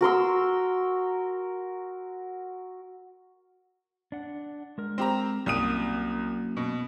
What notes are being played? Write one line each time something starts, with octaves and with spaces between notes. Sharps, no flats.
F#4 A#4 C6 E6
D4 F#5
G#3 A#4
C4 G4 A#5
C2 F#3 A#3 C#4 D#6 D#7
B2